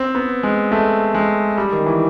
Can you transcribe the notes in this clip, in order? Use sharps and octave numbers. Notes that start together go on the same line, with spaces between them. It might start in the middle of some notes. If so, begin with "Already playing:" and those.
Already playing: C4
B3
G#3
A3
G#3
G3
D#3
E3